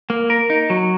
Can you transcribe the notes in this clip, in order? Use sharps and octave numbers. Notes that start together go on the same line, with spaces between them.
A#3
A#4
D#4
F#3